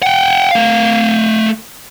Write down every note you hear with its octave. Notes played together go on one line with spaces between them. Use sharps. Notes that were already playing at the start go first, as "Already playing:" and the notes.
F#5 G5
A3 F5